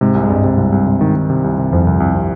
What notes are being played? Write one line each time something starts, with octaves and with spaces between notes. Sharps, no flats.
G#2 C3 G#3
C2
G#3
C2 G2 G3
C3
C2
C2
C3
D#3
D#3
C3
C2
C3
C2 F2 F3
C2
C2
C3